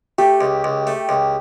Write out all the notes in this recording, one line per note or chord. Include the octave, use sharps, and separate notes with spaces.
A3 G4
C#2
C#2
A3
C#2